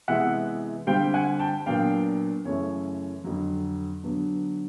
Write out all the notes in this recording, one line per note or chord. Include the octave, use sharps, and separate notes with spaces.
C3 E3 G#3 B3 E5 F#5
D3 G3 C4 F5 G5
F#5 G#5
G5 A5
A#2 F#3 B3 D4 F5 G5
F#2 C#3 E3 A3 C#5
F2 D3 F#3
D3 F#3 B3 D4